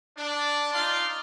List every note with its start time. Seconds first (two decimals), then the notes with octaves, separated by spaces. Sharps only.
0.18 D4
0.74 D#4 F4 D5 C6